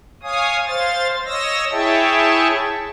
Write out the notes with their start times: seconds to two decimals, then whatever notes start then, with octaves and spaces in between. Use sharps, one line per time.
0.23 C#5 F5 G#5 D#6
0.67 C5 F5 A6
1.25 C#5 D#5 E6 A#6
1.71 E4 G#4 C#5 E5 G5 A5